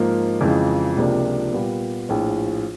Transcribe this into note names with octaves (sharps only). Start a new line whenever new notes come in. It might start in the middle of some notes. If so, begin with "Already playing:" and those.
Already playing: G#2 F3 A#3
F2 C#3 E3 G#3
C#2 C3 F3 A#3 D4
A#2 G3 B3
A#1 A2 F3